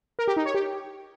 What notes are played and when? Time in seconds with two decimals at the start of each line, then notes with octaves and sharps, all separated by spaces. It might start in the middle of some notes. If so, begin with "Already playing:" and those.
0.19 A#4
0.28 G4
0.37 D#4
0.46 C#5
0.54 G4